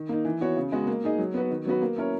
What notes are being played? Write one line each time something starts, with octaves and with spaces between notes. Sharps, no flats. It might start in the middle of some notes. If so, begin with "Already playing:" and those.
Already playing: D#3
A#3 D#4
E3
B3 F#4 C#5
C#3
G#3 B3 F#4
A#3
D#4 G#4 D#5
F#3
B3 F#4 B4
D#3
F#3 B3 F#4 B4
A#3
C#4 E4 A#4 C#5